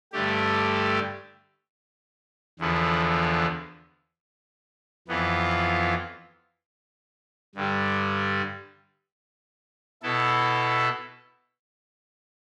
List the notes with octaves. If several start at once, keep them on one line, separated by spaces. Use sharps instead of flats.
G2 D3 A3 D4 G4
E2 D3 F3 B3
F2 E3 B3 F4
G2 D3 G3
B2 B3 E4 A4